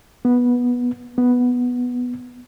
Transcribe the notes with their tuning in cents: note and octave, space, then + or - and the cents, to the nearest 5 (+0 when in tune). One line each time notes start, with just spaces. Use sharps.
B3 -15
B3 -5